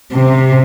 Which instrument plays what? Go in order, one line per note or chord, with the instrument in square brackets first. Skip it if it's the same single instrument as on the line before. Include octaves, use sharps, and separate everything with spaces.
[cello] C3